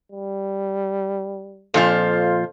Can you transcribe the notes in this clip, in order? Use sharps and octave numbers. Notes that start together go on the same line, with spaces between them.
G3
F2 A#2 F3 F4